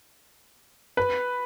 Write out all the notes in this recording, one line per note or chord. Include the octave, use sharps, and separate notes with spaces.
B4